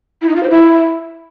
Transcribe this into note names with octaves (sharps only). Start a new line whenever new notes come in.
E4
D#4
F4
C5
E4